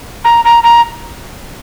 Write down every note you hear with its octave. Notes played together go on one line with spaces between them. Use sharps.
A#5
A#5
A#5